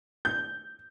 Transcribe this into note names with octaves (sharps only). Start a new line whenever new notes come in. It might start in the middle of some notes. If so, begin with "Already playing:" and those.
G6